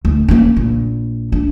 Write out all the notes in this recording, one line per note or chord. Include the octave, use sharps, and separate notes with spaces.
D2
A#3 C#4
A#1
D4